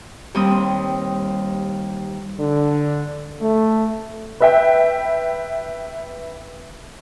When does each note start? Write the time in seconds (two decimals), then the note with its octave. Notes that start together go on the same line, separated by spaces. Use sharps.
0.35 D#2 G3 C4 D#6
2.37 D3
3.39 A3
4.40 B4 E5 G5